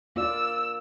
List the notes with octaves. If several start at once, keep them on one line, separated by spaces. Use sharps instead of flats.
A#3 F4 D5 E6